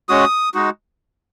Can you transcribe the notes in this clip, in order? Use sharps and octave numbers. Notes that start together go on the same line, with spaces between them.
G#3 C#4 F#4 D#6
G#3 D#4 F#4